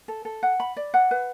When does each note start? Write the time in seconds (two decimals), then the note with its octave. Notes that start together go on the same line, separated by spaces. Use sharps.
0.08 A4
0.25 A4
0.43 F#5
0.60 B5
0.77 D5
0.94 F#5
1.11 B4